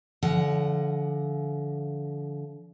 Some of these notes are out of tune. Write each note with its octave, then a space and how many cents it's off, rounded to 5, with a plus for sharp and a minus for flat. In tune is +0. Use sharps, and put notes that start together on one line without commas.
D3 -30 F3 -45 F#5 +10